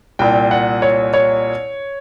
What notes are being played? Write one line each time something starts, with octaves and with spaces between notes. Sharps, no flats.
C2 A#2 G5
F#5
C#5
C#5